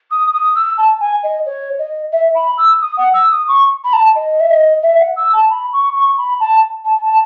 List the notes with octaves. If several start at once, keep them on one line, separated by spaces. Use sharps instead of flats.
D#6
D#6
E6
A5
G#5
D#5
C#5
D#5
E5
B5
E6
D#6
F#5
E6
D#6
C#6
B5
A5
D#5
E5
D#5
E5
F#5
E6
A5
B5
C#6
C#6
B5
A5
A5
A5